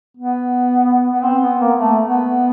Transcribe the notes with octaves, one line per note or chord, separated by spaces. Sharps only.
B3
B3
C4
B3
A#3
A3
B3